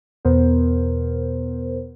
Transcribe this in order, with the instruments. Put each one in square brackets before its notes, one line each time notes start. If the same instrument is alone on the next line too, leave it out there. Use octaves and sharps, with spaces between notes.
[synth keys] E2 B2 B3 A#4 C5